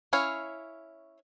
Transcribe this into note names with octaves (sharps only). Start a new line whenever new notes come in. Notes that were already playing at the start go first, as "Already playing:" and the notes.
C#4 E4 C#5 F5